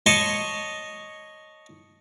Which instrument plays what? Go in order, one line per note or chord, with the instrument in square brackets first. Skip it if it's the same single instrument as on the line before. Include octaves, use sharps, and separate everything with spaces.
[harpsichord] C#5 D#5 A5 C6 C#6